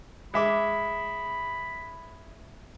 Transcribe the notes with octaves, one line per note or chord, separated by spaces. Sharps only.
G#3 E5 B5 D6